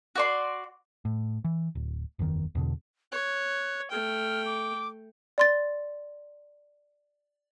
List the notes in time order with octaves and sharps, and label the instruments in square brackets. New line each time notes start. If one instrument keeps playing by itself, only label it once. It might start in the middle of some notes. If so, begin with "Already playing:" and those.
[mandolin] F#4 D5 C6
[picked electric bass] A2
E3
D1
F#1 E2 D3 D#3
E2 B2 D3
[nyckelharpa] C#5 [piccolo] F#6
[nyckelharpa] A3 G5 [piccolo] F6
[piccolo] D6
[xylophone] D5 C6 A6